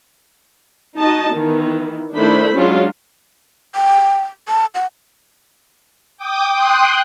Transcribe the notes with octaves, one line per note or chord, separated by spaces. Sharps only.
D#4 F#4 D#5 A5
D#3 E3 B3
D#3 A3 D4 E4 C5 B5
F#3 G#3 C#4 D4 F4
G5
A5
F#5
G5 D6 D#6
G5 C6 D#6 F#6